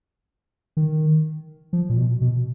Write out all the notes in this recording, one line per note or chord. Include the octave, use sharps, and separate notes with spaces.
D#3
F3
A#2
B2
B2